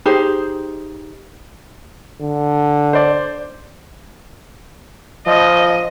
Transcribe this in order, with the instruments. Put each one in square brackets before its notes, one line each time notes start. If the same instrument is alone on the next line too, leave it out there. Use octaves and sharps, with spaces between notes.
[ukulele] D#4 G4 G#4 C5
[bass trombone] D3
[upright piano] C5 D5
[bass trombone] F3 [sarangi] D#5